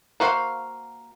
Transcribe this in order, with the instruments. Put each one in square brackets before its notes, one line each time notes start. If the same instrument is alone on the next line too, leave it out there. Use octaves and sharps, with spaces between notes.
[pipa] A#3 F#4 C5 F5